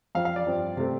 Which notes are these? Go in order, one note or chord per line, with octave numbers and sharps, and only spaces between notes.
F2 F3 C4 F5
F5
D5
G2 F3 C4
C3 A3 C4